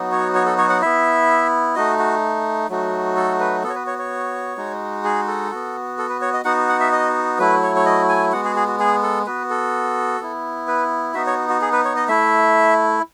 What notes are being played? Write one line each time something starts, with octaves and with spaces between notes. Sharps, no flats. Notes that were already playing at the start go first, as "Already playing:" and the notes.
Already playing: F#3 B3 D#4 F#4
C#5
C#5
A4
C#5
F#5
B3 E4 E5
A3 D#4 F#4 D#5
F#4
F#3 A3 D#4 F#4
A4
B4
B3 F#4 A4 C#5
B4
C#5
C#5
G#3 D#4 F#4
G#4
A4
B3 F#4
A4
B4
C#5
D#5
B3 D#4 F#4 F#5
F#5
E5
D#5
F#3 A3 E4 B4
C#5
C#5
D#5
G#5
G#3 B3 F#4 F#5
G#4
G#4
F#4
G#4
A4
B3 F#4 B4
A4
B3 E4
B4
B3 D#4 F#4 E5
C#5
F#4
G#4
B4
C#5
D#5
A3 E4 E5